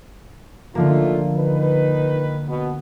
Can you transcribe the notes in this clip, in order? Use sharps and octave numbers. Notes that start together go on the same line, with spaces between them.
D3 F3 A3 A#3 D#4 F4
D#3 D#4 B4
B2 B3